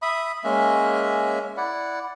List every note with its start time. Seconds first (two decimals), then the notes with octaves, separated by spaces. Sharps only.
0.02 E5 B5 D#6
0.44 G#3 A#3 C#4 E5
1.57 E4 D5 F#5